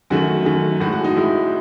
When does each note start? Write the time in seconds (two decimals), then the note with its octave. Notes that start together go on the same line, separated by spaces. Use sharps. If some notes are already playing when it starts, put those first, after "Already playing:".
0.10 F#2 D#3 A3 F#4
0.45 F#2 D#3 A3
0.80 A2 F#4
0.85 G#3
0.93 F#4
1.04 D#4
1.16 A2 G#3 E4